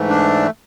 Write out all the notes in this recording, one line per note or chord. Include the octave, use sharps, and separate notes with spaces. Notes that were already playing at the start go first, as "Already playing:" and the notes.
Already playing: G#2 E3 A3
D4